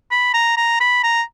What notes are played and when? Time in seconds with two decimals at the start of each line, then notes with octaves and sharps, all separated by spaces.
0.11 B5
0.34 A#5
0.57 A#5
0.80 B5
1.04 A#5